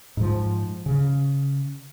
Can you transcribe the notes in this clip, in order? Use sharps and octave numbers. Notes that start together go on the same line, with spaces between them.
G#2 F3
C#3